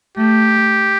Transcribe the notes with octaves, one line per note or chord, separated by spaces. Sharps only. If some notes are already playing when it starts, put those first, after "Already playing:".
A3 G4